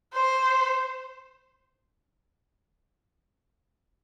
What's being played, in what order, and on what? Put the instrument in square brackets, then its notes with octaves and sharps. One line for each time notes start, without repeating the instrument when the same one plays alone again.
[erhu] C5